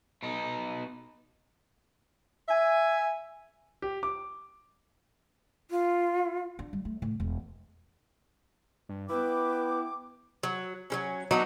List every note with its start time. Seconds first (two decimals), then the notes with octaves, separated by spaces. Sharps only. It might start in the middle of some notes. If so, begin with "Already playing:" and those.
0.23 B2 D#4
2.48 E5 G#5
3.82 G4
4.03 D6
5.71 F4
6.59 D4
6.73 G3
6.85 A3
7.02 A2
7.20 E1
8.89 G2
9.09 B3 E4 B4 G5 D6
10.43 F#3
10.90 F#3 G3 C#4
11.31 F#3 B3 D4 D#4